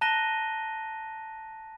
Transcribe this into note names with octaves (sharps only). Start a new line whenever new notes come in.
A5 A#5 F#6 A#6 D#7 G7